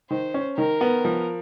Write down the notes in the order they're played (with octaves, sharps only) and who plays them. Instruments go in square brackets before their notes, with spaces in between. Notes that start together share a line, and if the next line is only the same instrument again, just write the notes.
[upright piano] D#3 [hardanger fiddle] C5
[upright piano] C#4
[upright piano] D#3 [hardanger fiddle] A#4
[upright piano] B3
F3